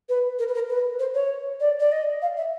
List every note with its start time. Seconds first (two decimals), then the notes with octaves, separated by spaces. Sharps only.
0.09 B4
0.39 A#4
0.48 B4
0.54 A#4
0.69 B4
0.99 C5
1.14 C#5
1.60 D5
1.80 D5
1.92 D#5
2.22 F5
2.36 E5